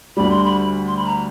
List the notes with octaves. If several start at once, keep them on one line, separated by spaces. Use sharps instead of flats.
D2 D3 G3 B5
C6
B5
C6
B5
A#5